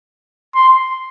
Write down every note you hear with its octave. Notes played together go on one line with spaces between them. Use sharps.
C6